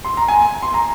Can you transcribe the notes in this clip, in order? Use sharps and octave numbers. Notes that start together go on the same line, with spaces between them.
C6
A#5
G#5
C6
A#5